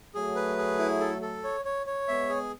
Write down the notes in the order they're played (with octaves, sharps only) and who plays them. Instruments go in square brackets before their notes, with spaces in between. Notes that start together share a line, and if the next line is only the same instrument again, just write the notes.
[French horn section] F#3 A3 [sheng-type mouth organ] G#4
[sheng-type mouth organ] B4
G#4
E4
A4
A4
C#5
C#5
C#5
[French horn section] G#3 B3 [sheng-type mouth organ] E5
[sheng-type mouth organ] G#4